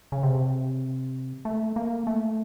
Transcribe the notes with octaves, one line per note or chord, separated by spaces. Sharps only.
C#3
C3
A3
A#3
A3